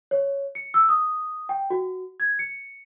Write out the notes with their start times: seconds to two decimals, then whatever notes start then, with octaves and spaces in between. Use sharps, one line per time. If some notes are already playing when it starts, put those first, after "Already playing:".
0.11 C#5
0.55 C#7
0.74 E6
0.89 D#6
1.49 G5
1.70 F#4
2.20 G#6
2.39 C#7